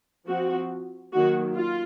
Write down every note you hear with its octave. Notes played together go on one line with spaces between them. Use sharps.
F3 C4 F#4
D#3 F#3 A#3 F#4
F4